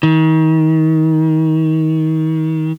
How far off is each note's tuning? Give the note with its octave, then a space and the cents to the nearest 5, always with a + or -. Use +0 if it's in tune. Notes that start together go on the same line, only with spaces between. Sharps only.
D#3 +30